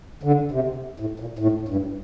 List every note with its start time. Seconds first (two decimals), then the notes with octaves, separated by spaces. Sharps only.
0.23 D3
0.51 C3
1.00 A2
1.20 A#2
1.39 A2
1.68 G2